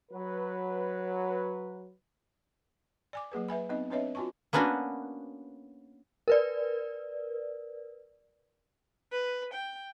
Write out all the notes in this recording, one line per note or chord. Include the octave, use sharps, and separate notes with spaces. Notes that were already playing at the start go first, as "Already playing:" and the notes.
F#3 B4
D5 G#5 D6
F#3 A#3 G#4 B4
B4 E5 G#5 B5
B3 C4 D#4 D#5
C4 D4 B4 C#5 D#5 E5
F4 F#4 G#5 A5 C#6
A#3 B3 C#4 D4 F#4 B4
A#4 B4 D5
B4
G5